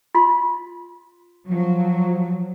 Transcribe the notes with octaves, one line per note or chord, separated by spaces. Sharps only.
F4 C6
F3 F#3